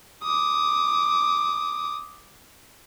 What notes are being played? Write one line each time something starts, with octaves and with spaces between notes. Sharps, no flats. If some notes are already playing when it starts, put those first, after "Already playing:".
D6 D#6